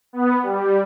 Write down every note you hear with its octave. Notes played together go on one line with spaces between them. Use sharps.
B3
G3